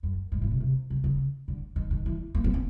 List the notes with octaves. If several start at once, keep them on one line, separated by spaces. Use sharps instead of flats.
F#2
G#2
A2
B2
C3
C#3
C#3
D3
D#3
D#3
E3
A#3
B3
C4